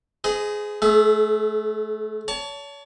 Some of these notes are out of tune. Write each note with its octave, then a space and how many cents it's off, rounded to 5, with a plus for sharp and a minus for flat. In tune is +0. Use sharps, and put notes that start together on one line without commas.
G#4 +10 C5 -40 D#5 +0
A3 -25 G#4 +40 E5 +15
C#5 +35 A5 +0